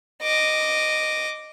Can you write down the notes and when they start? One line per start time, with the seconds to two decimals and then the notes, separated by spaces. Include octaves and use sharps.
0.23 D#5 D6